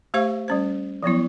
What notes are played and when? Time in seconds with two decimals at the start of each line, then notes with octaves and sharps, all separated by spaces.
0.14 A3 G4 C5 F5 C#6
0.48 G3 C#4 C5
1.03 F3 F#3 B3 E4